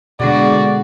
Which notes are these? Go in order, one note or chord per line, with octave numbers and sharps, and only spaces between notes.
B2 D3 G#3 B3 F#4 G#4 D5